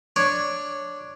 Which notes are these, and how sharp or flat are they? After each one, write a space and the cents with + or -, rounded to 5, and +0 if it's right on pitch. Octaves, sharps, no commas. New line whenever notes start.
D4 +0 C#5 +0